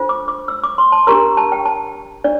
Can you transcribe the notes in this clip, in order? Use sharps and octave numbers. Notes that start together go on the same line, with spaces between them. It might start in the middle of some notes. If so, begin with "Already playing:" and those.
Already playing: D4 F4 A4 C5
D6
D6
E6
D6
C6
A5
D4 G4 A#4 A#5
A5
G5
A5
D4 D5